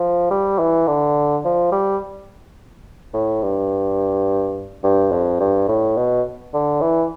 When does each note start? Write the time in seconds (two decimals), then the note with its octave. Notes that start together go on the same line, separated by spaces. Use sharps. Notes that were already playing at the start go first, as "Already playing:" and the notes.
Already playing: F3
0.31 G3
0.59 E3
0.87 D3
1.45 F3
1.72 G3
3.14 A2
3.43 G2
4.83 G2
5.12 F2
5.40 G2
5.68 A2
5.97 B2
6.54 D3
6.81 E3